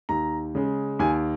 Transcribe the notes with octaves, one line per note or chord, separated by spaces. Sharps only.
D#2 A#5
C#3 G#3
D#2 G#5